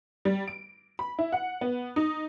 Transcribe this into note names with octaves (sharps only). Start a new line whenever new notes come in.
G3
D7
B5
E4
F#5
B3
D#4